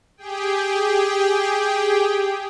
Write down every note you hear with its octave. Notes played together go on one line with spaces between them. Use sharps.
G4 G#4 G5